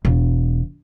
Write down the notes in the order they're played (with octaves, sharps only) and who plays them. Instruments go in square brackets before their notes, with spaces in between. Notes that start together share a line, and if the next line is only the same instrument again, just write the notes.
[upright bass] E1